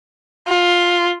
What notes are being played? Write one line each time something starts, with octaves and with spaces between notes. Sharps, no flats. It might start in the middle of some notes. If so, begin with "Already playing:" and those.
F4